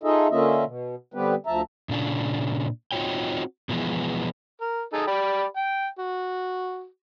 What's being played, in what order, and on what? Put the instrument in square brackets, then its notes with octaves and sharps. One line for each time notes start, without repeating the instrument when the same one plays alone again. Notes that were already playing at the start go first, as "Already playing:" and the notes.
[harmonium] D#4 F4 G#4 A4 D#5 E5
D3 A#3 C#4 F4 D#5 E5
B2
D3 G3 B3 C4 G4 B4
D2 F3 E5 A5 A#5
[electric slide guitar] A#2 C#3 D4
C4 D#4 F4 F#4 C#5 G5
B2 E3 F3 G#3 B3
[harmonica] A#4
D#4 G#4 A4
G4 D5 B5
G5
F#4